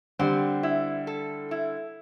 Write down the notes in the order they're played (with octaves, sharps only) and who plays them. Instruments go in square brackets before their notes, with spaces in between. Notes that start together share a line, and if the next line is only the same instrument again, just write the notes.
[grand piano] D3 G3 [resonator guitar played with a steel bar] C4
[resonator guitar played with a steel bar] E4
A4
E4